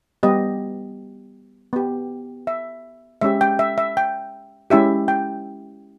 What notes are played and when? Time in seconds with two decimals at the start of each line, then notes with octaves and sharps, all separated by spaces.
0.23 G3 B3 G4 D#5
1.73 B3 G4
2.47 E5
3.21 G#3 C#4 G4 E5
3.41 G5
3.59 E5
3.78 E5
3.97 G5
4.70 G#3 C#4 E4 G4 E5
5.08 G5